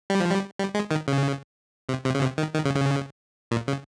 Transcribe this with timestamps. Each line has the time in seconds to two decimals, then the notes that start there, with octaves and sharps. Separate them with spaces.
0.10 G3
0.20 F3
0.30 G3
0.59 G3
0.74 G#3
0.91 D#3
1.08 C#3
1.89 C3
2.05 C3
2.15 C#3
2.21 C3
2.38 D#3
2.54 D#3
2.65 C#3
2.76 C#3
3.51 A#2
3.68 C#3